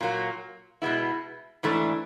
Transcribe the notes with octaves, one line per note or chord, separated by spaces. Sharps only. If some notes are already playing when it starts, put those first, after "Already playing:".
A#2 F#3 A#3
B2 G#3 B3 E4
G#2 E3 A3 D4